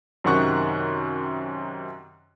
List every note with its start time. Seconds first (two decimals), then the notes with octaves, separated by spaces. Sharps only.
0.24 F#2 C3 D#3 F#5 C#6 F#6